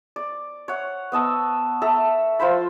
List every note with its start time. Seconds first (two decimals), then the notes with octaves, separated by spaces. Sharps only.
0.16 D5
0.68 C#5 F#5
1.12 B3 D#5 A5 E6
1.82 A4 E5 A#5
2.39 F3 F4 C5 B5